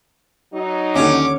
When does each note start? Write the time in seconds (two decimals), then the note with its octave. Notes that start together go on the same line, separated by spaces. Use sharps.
0.54 F#3 D#4
0.95 D#2 D3 C#4 D6